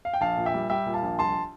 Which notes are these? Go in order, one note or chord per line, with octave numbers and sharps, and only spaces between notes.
F5
G5
A#1 F5 A5
A#2
E5 G5
G3
G3 E5 G5
A#2
F5 A5
A#1
C2 A5 C6